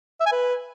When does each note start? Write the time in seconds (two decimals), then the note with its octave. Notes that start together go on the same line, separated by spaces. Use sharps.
0.20 E5
0.26 G#5
0.32 B4